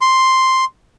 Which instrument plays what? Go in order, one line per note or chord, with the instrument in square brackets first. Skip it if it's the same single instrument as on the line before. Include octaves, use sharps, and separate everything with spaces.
[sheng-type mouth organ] C6